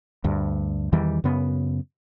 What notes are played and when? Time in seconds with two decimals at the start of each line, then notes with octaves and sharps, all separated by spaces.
0.24 D2 G2
0.93 E2 D#3 E3 G3
1.24 F#2 C#3 B3